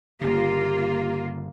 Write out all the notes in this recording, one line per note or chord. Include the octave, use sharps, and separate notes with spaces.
G1 C#3 A#3 F4 G4